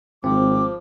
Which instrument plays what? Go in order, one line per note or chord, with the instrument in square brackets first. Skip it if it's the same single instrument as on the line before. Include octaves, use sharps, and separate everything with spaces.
[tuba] G#1 [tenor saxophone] F3 [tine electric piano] C4 [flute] D6